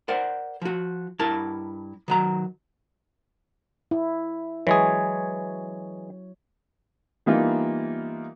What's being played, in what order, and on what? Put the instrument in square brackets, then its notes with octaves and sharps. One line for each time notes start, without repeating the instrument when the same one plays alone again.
[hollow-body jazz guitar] A#4 C5 D5 F#5
F3 F#4
G2 E4 A#4 A5
D#3 F#3 A#5
[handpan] E4
[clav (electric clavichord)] E3 G#3 G#4 [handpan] F#3 C#5
[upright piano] E3 G3 A#3 B3 D#4 F4